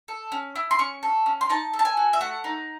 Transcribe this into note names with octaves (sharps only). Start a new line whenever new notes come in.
A4
C#4
E4
C6
C#4 C#6
A4
C#4
C6
D#4 A5
A4
A5
G#5
F#4
E5
A3 F#5
D#4